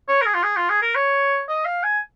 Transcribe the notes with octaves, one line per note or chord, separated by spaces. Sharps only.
C#5
A#4
G#4
F4
G#4
F4
G#4
A#4
C#5
D#5
F5
G#5